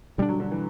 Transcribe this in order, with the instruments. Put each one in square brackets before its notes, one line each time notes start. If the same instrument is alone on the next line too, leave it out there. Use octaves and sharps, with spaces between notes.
[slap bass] B2 G3 D4 [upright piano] D3
[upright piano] F#3
D3
E3